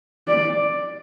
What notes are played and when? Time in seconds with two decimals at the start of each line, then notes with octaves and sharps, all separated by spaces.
0.28 D5